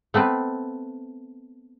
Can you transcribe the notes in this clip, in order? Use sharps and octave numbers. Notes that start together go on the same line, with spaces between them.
A3 B3 C4 B4